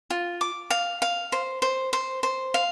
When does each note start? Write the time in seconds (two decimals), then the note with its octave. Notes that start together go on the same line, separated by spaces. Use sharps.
0.10 F4
0.41 D6
0.70 F5
1.02 F5
1.32 C5
1.62 C5
1.93 C5
2.23 C5
2.54 F5